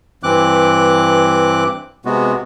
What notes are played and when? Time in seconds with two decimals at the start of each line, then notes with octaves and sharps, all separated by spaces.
0.23 G2 E3 C4 D6 F#6
2.05 C3 G#3 B3 F#4